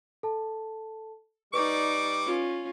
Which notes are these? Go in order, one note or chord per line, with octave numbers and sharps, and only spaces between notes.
A4 A5
G3 D#4 B4 D5 C#6 D6 D7
C#4 F4